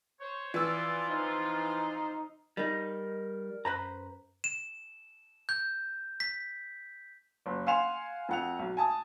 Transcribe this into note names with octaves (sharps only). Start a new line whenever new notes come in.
C5 C#5
C3 E3 F3 F4 D5 E6
D#4 C5
G3 D#4 A#4
F#2 B4 C5 A#5
E7
G6
B6
F#1
F5 F#5 G#5 C6 E7 F7
F2 F#5 F7
B1
G#5 A5 D#6